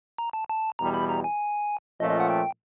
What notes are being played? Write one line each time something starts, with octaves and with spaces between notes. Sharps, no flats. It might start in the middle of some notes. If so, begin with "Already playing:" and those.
A#5
A5
A5
E2 B2 G3 A#5
B5
A#5
G#5
A#2 F3 A3 C#4 D#5
D#5
F#5
G5